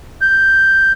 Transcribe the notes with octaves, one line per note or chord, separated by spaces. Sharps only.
G6